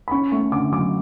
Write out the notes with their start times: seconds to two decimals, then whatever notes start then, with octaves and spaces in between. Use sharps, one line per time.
0.08 B5
0.11 C#4 C#6
0.32 A3 C#6
0.52 D3 D6
0.72 F#3 D6